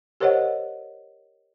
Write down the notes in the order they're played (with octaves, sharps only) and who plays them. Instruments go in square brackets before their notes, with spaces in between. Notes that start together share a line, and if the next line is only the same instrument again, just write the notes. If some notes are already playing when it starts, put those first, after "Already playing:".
[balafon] G4 A#4 C5 C#5 D#5 F#5